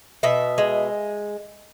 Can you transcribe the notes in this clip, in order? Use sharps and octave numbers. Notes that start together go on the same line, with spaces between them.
B2 E5
G#3